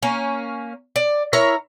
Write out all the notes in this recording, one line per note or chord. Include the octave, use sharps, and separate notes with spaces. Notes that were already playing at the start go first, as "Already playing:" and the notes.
A#3 C#4
D5
E4 A#4 C#5 A#5